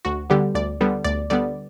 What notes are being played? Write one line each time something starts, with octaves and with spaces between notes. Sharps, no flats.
D2 F#4
D3 G3 B3 G4
D2 D5
D3 G3 B3
D2 D5
D3 G3 B3 D5